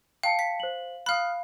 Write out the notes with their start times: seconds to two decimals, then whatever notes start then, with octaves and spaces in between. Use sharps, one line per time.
0.23 F5 G5 A5 C#7
0.39 B6
0.60 C5 F#7
1.06 F5 B5 D#6 F6 F#6